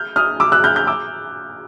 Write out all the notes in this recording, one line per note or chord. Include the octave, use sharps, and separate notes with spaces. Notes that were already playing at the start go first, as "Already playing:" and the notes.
Already playing: F6 G6
D#6 F6
D6 E6
E6 F#6
F6 G6
F6 G6
D6 E6